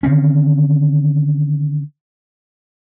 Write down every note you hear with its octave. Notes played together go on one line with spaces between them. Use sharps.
D3 D#3 C4 C#4